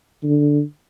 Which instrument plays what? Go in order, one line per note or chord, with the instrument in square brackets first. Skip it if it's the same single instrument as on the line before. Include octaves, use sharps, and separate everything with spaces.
[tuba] D3